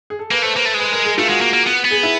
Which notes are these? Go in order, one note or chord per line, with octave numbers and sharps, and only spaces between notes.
G#4
A4
A#3 B4
A3 C5
A#3 B4
A3 C5
G#3
B4
A#4
G#4
A3 F4
G#3 F#4
A#3
A#3
B3
B3
G#4
E4